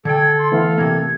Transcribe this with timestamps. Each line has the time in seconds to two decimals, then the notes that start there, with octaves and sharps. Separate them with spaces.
0.05 D3 A4 G5 G#6
0.38 C6
0.52 E3 A3 B3 F5
0.78 C3 A#3 G#6